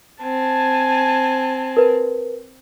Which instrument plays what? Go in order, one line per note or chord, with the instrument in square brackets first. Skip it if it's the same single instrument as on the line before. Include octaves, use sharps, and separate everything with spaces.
[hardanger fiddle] C4 [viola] G#5 A5
[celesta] A#4 B4